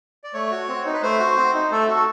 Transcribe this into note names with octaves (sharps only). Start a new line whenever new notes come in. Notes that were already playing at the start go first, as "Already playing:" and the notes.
D5
A3 C#5
F#4
C4
D#4
B4
A3 C5
F#4
C4
D#4
A3 A4
F#4
A4